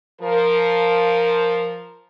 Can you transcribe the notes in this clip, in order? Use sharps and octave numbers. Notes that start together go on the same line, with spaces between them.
F3 A#4